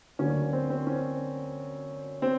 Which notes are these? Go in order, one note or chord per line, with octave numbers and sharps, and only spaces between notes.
D2 D3 F#3 A#3 C#4
C4
C4
C#4
C4